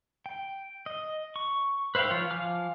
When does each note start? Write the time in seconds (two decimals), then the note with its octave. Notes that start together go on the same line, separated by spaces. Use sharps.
0.26 G5
0.86 D#5
1.36 C#6
1.95 B4 C5 E5 F5 G5
2.10 F3 F4 C#5
2.31 F3 F5 G#5 D6 F6